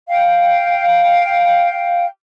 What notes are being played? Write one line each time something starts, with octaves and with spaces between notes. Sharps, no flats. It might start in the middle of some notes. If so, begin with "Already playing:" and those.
F5 G5